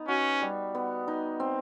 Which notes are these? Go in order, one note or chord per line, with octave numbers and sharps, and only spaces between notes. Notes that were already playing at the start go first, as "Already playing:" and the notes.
Already playing: B3 D#4
C#4 F#4
G3
B3
D#4
C4